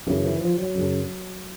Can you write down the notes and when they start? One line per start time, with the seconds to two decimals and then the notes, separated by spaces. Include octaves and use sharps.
0.07 F#2 C#3 E3
0.25 E3
0.41 F3
0.58 F#3
0.75 F#2 C#3